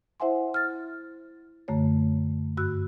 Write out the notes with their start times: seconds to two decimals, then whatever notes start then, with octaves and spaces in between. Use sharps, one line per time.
0.20 E4 C5 E5 F#5 G#5 C6
0.54 F6 A6
1.68 F#2 D3 A3 C#5
2.57 G2 F#4 E6 F#6